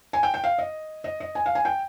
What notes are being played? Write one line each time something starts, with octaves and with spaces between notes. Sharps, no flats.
G#5
G5
G5
F5
D#5
D#5
D#5
G#5
F5
G#5
G5